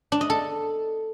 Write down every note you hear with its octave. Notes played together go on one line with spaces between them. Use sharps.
D4
D#5
A4